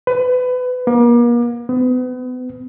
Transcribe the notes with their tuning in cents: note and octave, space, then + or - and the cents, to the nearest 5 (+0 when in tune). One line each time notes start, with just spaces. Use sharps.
B4 +25
A#3 +40
B3 +35